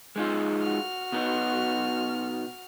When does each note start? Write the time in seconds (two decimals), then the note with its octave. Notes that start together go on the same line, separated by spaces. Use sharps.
0.16 G#3 D#4 F4
0.62 F#4 F6
1.12 B2 B3 D#4